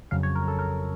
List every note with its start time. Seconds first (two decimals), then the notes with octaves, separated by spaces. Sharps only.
0.11 F2 C#3 F#3 F5
0.23 C#5
0.35 A#4
0.48 A4
0.59 A#4